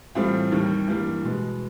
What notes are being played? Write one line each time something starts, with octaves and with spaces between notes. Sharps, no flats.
A2 E3 G3 C4 F4
D#2 D#3 G3
G2 E3 G3 A#3
B2 G#3 B3